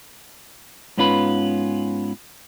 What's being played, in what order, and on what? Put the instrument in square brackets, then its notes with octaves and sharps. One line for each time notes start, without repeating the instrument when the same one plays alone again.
[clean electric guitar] G#2 B3 C#4 F4 B4 B5